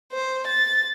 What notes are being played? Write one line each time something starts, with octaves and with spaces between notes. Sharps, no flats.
C5
A6